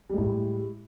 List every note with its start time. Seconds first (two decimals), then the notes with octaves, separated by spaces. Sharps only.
0.09 G3
0.14 G#3
0.18 A2